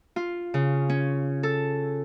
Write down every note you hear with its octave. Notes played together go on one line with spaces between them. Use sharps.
F4
C#3
C#4
A4